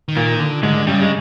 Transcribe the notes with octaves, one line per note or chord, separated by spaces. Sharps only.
D#3
A#2 A#3
D3
G#2 D3 G#3
G2 C#3 G3
G#3